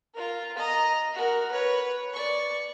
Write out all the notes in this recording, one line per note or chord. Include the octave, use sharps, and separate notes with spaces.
F4 A#4
D#5 A#5
F#4 A#4
B4 C#5
D5 C#6